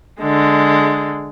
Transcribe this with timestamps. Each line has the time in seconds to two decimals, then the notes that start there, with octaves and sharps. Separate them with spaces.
0.20 D3 G#3